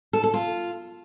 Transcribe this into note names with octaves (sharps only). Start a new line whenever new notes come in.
A4
A4
F4